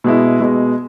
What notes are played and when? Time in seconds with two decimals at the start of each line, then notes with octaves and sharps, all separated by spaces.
0.04 B2 G#3 E4
0.40 B2 G#3